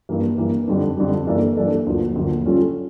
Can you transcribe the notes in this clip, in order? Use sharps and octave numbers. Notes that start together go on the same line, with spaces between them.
G2 E3 A#3
G2 E3 A#3
F2 D3 G3
F2 D3 G3
G2 E3 A#3 D4 A4
G2 E3 A#3 D4 A4
D2 D3 F3 A#3
D2 D3 F3 A#3
G3 C#4 F4 A4